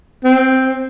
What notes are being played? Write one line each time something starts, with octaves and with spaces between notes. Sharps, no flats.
C4